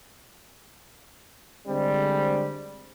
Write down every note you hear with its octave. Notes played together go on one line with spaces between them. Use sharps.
D3 G3 G#3 C4